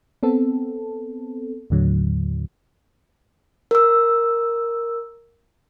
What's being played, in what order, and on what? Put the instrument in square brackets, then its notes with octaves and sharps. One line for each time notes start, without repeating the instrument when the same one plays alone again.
[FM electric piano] B3 C4 A4
D#2 A2 D3 F#3
[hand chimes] A#4 E6